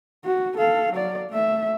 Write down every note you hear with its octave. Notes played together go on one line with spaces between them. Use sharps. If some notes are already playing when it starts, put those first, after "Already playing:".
F#4
A4 F5
F#3 D5
A3 E5